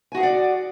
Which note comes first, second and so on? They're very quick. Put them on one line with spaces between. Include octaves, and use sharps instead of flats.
G#5 F#4 G#4 F#5 D5